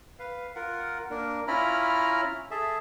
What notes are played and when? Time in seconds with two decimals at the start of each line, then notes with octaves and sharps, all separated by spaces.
0.19 B4 F5
0.56 F4 A#4 F#5
1.10 A#3 D4 A#4
1.48 C#4 E4 F4 A#5 B5 F6
2.51 G#4 A4 E5